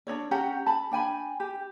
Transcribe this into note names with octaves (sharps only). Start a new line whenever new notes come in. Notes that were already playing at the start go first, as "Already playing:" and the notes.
D4 D#4 C#5 D5
C#4 G4 F#5 A#5
A5 B5
D4 G5 G#5 B5
G4